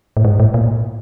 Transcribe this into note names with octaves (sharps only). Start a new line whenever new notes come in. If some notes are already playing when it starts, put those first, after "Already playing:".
A2
G#2
A2
A#2